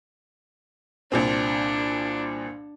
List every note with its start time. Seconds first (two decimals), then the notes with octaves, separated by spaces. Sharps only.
1.12 C2 A#2 C4 D4